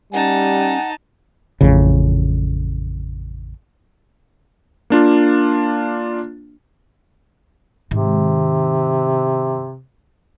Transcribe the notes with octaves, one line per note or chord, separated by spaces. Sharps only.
G3 C#4 D#4 F#5 A5
A1 F2 C#3
A#3 D4 F4
G#2 C3 D#3